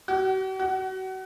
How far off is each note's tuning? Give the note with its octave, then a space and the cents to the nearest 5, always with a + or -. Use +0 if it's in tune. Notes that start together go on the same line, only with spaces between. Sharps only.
F#4 +45
F#4 +30